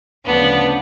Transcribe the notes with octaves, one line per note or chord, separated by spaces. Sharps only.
D2 C#3 F3 B3 D4